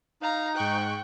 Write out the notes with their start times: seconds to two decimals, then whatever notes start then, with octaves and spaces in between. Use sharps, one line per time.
0.22 D#4 F5 A#5
0.55 G#2 G5 C#6 F#6